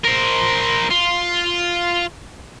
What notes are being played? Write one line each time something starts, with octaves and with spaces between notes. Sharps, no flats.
A#4 C5
F4